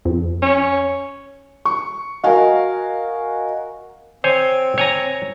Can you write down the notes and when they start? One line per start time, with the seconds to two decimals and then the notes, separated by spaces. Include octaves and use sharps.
0.05 F2
0.42 C#4
1.65 C#6
2.24 F#4 A#4 D#5 F5 G#5
4.24 C4 C5 C#5 G#5
4.78 C#5 G#5 A#5